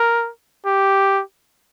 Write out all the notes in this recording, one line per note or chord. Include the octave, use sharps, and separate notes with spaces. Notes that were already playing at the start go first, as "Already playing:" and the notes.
Already playing: A#4
G4